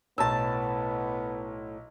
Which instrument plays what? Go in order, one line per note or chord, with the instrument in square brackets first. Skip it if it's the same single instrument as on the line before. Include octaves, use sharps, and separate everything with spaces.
[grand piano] B1 A#5 E6 [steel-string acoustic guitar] A2 A5 [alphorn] B3